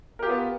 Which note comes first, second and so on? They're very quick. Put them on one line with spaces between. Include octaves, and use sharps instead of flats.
A#4 G4 F4 B3